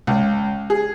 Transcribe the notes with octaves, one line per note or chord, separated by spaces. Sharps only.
C#2
G#4